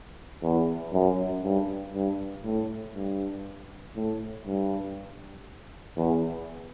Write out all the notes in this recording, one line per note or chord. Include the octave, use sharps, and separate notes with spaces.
E2
F#2
G2
G2
A2
G2
A2
G2
E2